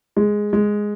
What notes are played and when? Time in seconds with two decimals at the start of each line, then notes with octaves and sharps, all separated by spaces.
0.17 G#3
0.53 G#3